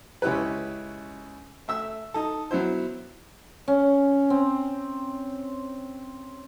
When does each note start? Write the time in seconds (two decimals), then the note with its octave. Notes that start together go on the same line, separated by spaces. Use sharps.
0.22 C#2 C#4 E4 G4 B4
1.68 A3 E5 E6
2.14 D#4 A4
2.51 F#3 B3 E4 C5
3.68 C#4
4.30 C4